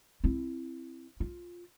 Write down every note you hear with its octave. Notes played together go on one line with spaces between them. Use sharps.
C4 E4
F4